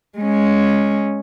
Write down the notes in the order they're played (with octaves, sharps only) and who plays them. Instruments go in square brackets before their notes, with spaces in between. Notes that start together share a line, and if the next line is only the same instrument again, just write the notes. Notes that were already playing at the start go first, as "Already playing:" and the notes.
[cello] G#3 C#4